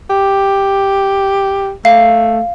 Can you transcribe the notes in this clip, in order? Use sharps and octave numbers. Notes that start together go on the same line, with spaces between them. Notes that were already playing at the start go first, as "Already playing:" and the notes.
G4
A3 F5